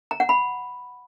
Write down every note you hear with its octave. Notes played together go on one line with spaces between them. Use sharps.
A#5
F#5
B5